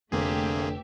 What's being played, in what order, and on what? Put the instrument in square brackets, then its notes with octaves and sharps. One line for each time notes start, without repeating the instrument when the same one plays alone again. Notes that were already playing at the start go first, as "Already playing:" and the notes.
[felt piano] F1 [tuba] D3 [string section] A3 G4 E5 [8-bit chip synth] A#3 C4 G#4